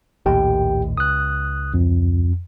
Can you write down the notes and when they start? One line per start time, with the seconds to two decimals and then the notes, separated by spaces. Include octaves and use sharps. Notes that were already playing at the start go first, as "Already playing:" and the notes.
0.26 A#1 D#2 A2 G4 G5
0.97 C#2 D#6 F#6
1.74 F2